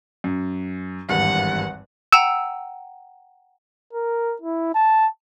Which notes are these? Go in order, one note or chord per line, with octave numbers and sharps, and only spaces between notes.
F#2
G#1 E2 G2 F#5
F#5 G5 A#5 E6
A#4
E4
A5